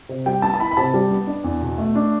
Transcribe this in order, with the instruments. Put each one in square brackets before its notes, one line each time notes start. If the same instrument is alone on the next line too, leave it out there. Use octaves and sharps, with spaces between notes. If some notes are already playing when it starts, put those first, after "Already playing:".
[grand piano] C3
G3 G5
B3 A5
A5
E4 B5
B5
C3 A5
G3
B3
D4
E2
B2
A3
D4